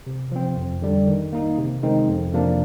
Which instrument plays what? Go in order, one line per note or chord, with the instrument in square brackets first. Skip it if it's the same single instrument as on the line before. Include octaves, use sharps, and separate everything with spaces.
[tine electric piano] C3
F3 C4
F2
D3 G3 D4
D#3
A#3 D#4
C3
D#3 G#3 C4 D#4
F2
C3 F3 A#3 D4